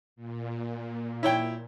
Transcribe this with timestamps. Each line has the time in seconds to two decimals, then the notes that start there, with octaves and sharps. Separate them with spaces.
0.16 A#2
1.23 E4 C#5 G5